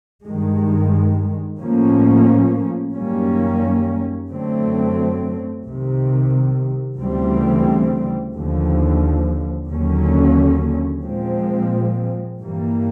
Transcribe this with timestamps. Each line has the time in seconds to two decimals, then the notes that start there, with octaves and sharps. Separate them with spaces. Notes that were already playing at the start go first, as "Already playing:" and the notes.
0.23 G2 D#3 G#3
1.59 A2 F3 A#3 C#4
2.93 F#2 D#3 G3 A#3 C#4
4.29 F#2 D3 F#3 A3 C4
5.64 C2 C3 D#3
6.99 D2 C#3 E3 G3 C4
8.34 D#2 D3 F3
9.69 D#2 D3 F#3 A#3 C#4
11.04 A#2 F3 G#3 C4
12.40 G2 E3 G3 A#3